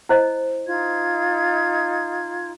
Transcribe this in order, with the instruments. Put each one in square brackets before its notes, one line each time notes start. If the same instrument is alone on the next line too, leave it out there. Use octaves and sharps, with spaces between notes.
[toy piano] E4 C5 D#5
[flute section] D#4 F4 G#6